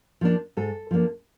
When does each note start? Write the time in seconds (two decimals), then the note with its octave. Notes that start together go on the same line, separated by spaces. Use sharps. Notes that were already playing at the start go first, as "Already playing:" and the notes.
0.21 F3 A#3 D4
0.57 G#2 A4
0.91 F3 A#3 D4